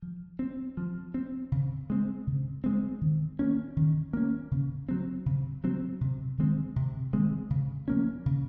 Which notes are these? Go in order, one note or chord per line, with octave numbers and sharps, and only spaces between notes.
F3
C4
F3
C4
C#3
G#3 C4
C#3
G#3 C4
D#3
A#3 C#4
D#3
A#3 C#4
C#3
F#3 C4
C#3
F#3 C4
C3
D#3 G#3 C4
C3
D#3 G#3 C4
C#3
F3 A#3 C#4
C#3